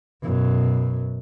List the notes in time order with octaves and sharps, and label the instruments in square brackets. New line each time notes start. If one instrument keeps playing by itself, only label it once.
[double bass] F#2 B2